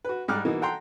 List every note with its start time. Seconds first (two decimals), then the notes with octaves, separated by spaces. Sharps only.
0.05 F#4 B4
0.28 G#2 G3 D6 F6 F#6
0.45 B2 E3 A#3 D#4
0.61 A4 F#5 G5 A#5 C6